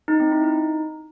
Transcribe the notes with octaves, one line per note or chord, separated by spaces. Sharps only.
D#4
C4
E4
D#4